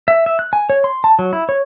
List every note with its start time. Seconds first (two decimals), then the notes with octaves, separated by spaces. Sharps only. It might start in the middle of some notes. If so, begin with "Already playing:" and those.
0.08 E5
0.26 E5
0.39 F#6
0.53 G#5
0.70 C#5
0.84 C6
1.04 A5
1.19 F#3
1.33 E4
1.49 C#5